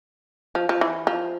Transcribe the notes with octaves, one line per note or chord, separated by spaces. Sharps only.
F3
F3
E3
F3